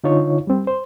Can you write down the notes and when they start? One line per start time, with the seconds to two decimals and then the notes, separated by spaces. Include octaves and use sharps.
0.04 D3 D#4 F4 C#5
0.47 G3 C4
0.67 C5